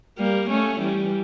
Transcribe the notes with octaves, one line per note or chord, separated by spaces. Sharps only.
G3 A#3
A3 C#4
E3 G3